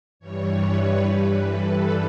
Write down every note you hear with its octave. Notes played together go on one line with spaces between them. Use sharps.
G2 E3 G3 C#5
B4
G2 E3 G3
A4